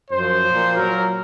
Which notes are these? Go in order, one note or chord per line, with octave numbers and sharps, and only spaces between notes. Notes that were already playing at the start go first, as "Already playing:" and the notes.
F#2 F3 C5
F3
A#2
A#2 F#3 A#4